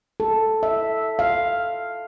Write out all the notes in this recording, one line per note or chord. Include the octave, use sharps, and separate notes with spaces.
A4
E5
F5